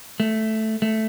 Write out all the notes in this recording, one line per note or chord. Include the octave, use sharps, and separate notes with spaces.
A3
A3